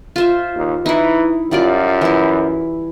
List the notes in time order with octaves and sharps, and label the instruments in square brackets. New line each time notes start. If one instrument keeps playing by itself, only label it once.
[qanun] F4 C5 E5
[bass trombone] D#2
[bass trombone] E3 [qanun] D#4 E4
[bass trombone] F#2 [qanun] G3 F4 D5
[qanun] E3 E4